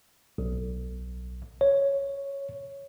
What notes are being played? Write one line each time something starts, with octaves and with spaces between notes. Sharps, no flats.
B1
C#5